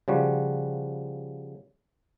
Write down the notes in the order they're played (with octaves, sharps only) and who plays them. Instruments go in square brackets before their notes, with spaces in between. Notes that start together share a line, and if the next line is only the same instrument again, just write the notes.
[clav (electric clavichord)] C#3 F3 G3 F#4